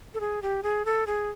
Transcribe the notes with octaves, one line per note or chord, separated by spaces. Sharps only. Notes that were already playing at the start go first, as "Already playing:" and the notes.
A4
G#4
G4
G#4
A4
G#4